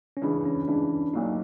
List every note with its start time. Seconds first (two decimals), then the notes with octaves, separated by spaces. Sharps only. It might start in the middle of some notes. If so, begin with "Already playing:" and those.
0.17 C#4
0.22 C#2 C#3 E3 D4
0.45 C#4
0.68 C#2 C#3 E3 D4
1.14 B1 A#2 F#3 A#3 D4 D#4